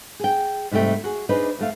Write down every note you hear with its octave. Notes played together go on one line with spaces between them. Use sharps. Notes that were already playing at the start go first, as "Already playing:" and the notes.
G#4 G5
G#2 C3 G3 A3 G5
F#4 G#4
D4 D#4 G#4 B4 C5 D#5
F2 A3 F5